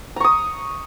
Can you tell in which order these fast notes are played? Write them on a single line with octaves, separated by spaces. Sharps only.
A#5 C#6 D#6